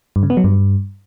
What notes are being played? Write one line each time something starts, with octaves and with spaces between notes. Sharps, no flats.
G2
C#3
B3
F#3
G2